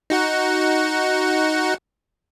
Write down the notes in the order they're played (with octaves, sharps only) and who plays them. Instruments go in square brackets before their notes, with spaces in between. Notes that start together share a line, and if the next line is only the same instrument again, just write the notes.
[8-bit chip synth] D#4 F#4 F#5